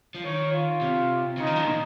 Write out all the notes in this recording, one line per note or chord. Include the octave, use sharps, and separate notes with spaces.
F3
D#3 C#5
F4
C3
C#3 D#4
D#3
F3
A#2